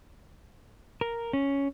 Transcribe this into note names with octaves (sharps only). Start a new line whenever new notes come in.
A#4
C#4